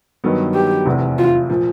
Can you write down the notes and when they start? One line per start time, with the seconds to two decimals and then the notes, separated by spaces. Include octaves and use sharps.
0.24 G2 D#3 F#3 B3
0.54 G4
0.86 F1 E2 C3
1.18 F4
1.50 A#2 F3